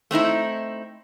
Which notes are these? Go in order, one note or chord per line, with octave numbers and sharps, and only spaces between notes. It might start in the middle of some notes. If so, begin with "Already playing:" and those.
A3 C4 D#4 E4